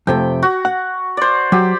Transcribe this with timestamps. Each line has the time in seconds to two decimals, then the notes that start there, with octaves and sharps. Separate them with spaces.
0.07 F2 C3 A3 G5
0.43 F#4
0.65 F#5
1.17 C5 D5
1.52 F#3 G4